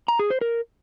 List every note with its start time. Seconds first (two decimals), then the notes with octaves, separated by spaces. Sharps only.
0.08 A#5
0.19 G#4
0.30 C5
0.41 A#4